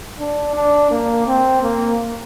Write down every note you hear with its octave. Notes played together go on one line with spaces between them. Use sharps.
D4
D4
A#3
C4
A#3